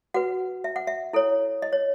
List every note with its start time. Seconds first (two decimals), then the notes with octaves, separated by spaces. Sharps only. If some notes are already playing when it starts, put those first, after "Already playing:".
0.14 F#4 B4 F#5
0.64 E5
0.76 F#5
0.87 E5
1.13 E4 A4 C#5
1.62 D#5
1.73 C#5